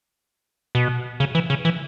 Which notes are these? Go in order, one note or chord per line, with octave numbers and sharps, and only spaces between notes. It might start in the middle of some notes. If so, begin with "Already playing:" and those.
B2
C#3
E3
C#3
E3